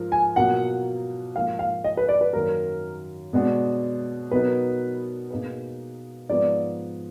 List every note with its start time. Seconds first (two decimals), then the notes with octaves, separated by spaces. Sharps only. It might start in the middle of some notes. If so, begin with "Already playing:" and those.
Already playing: G#2 F3 F4 A#4
0.12 G#5
0.36 B2 F#3 A#3 F4 A#4 F#5
1.35 G#2 F3 A#3 F5
1.59 F5
1.84 D#5
1.97 B4
2.09 D5
2.21 B4
2.33 F#2 D#3 F#3 A#3 A#4
3.33 B2 G#3 B3 D4 F#4
4.31 B2 F#3 B3 D#4 A#4 B4
5.30 B2 A#3 D#4 G#4 B4
6.29 G#2 F3 B3 F4 B4 D5